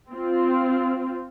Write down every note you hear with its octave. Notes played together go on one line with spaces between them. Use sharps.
C4 F4